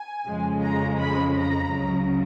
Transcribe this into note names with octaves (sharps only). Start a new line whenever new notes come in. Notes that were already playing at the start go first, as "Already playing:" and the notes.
Already playing: G#5
F2 C#3 F3 G#3
A#5
B5
A#5
C#2 C#3 F#3